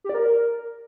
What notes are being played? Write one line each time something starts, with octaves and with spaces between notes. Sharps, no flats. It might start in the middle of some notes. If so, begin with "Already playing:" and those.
G4
D5
A#4